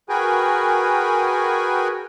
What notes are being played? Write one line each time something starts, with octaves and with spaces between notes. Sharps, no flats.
F#4 G#4 A#4 B4 G5 G#5